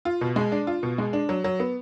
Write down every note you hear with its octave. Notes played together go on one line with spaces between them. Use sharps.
F4
B2
G#3
D4
F4
B2
G#3
D4
F#3
F#3
B3